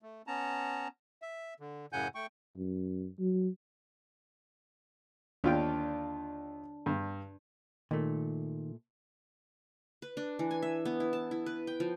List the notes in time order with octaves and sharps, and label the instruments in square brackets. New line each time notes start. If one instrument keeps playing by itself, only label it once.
[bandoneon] A3
B3 C#4 A5 A#5
E5
D3
F#2 A2 C#3 F#5 G#5 G6
A3 G5 C#6
[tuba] F#2
F#3
[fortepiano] D#2 F4 G5 [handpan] D4
[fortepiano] G2
[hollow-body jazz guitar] A#2 A3 [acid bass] D#3
[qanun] B4
D4
E3
G#5
E5
B3
E4
A5
E4
B4
G5
F3